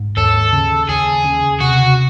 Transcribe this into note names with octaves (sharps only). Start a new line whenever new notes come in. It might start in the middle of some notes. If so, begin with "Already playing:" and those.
Already playing: G#2
D#2 A4
C#3
D#2 G#4
C#3
C3 F#4